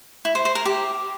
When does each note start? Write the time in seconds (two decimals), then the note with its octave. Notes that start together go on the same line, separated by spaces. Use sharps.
0.25 E4
0.35 C5
0.45 C5
0.55 A#4
0.65 G4